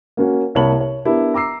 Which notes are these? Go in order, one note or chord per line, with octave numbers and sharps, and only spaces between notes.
A#3 C#4 F#4
C2 A#3 C#5 A5 B5 F#7
C#5
B3 D4 E4 G4 A#4
A#5 D6 E6 C7